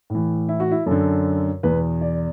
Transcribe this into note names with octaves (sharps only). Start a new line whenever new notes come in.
A2 E3
E4
F#4
E4
F#2 D3 A4
E2 B2 B4
D5